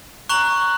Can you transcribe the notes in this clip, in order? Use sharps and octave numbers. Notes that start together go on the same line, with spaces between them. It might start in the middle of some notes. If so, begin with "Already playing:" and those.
A#5 C#6 F#6 F#7